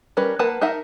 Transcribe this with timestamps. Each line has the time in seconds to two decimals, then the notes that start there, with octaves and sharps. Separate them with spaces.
0.17 G3 C#4 A#4 B4
0.39 A#3 A#4 B4 F#5 A5
0.61 D#4 A#4 E5 F#5 A5